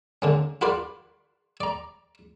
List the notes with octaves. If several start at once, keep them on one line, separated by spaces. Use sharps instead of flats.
D3 A#3 C#4
F4 F#4 A#4 B4 D5 F5
D5 A#5